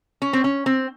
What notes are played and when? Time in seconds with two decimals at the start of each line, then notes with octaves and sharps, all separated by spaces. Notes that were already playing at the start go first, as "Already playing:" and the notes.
0.22 C#4
0.33 C4
0.44 C#4
0.66 C4